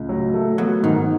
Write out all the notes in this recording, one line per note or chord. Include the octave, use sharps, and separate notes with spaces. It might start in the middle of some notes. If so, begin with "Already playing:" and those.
Already playing: C#2 A2
F#3
A3
F#3 B3
G#2 D#3